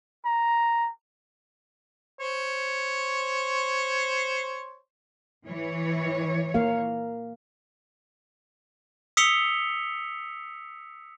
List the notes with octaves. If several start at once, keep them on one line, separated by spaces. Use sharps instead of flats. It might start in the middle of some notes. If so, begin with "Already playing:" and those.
A#5
C5 C#5
E3 C#5
A#3 A#4 F5
D#6 E6 B6 C#7 F7 G7